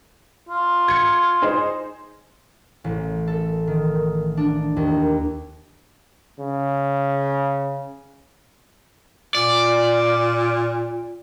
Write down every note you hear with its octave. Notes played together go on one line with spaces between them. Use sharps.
F4
G#6 C#7
D#4 G#4 C5
A1
A4
D#3
D4
D#2
C#3
A#2 D5